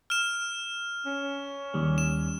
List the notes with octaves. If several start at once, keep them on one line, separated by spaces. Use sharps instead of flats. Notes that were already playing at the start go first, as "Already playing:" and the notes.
F6 E7
C#4
D#2 G3
E7